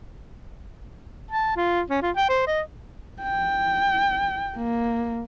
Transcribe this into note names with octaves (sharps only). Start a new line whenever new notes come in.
A5
F4
C#4
F4
G5
C5
D#5
G5
A#3